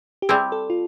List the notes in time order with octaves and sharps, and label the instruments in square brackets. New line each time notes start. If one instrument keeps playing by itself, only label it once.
[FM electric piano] G4
[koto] G3 C4 E4 [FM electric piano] G#4
[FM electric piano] A4
F4